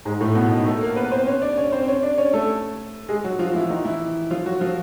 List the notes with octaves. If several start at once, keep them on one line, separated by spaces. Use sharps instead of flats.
G#2 G#3
A2 A3
B2 B3
D#3 D#4
A3 A4
A#3 A#4
B3 B4
C4 C5
C#4 C#5
D4 D5
C#4 C#5
C4 C5
C#4 C#5
D4 D5
C#4 C#5
A3 A4
G#3 G#4
F#3 F#4
F3 F4
E3 E4
D#3 D#4
E3 E4
F3 F4
F#3 F#4
F3 F4